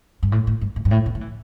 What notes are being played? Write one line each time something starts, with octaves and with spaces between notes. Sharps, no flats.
G2
A2
A2
G2
A2
G2
A2
B2
F#3
E3